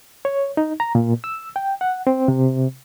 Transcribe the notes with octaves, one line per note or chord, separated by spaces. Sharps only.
C#5
D#4
A#5
A#2
E6
G5
F#5
C4
C3